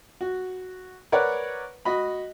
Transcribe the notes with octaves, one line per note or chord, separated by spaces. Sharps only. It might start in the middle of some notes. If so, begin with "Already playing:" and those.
F#4
A#4 B4 C#5 D5 F#5
F#4 D#5 B5